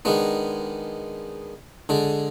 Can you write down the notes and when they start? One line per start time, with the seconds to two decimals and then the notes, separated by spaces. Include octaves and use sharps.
0.05 D#3 G#3 B3 D4
1.89 D3 G#3 D4